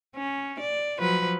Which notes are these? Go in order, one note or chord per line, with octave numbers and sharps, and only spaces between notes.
C#4
D5
F3 F#3 B4